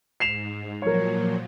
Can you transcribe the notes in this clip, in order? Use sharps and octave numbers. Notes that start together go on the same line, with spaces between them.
G#2 C7 E7 F7
A#2 F3 F#3 A#4 C#5